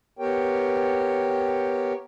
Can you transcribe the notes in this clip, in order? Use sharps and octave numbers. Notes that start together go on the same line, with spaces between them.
B3 G4 A#4 C#5 G5